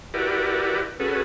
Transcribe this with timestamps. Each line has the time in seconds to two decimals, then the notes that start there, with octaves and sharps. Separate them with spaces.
0.14 E4 F#4 G4 A#4 B4 D5
1.00 C#4 F#4 G#4 A4 B4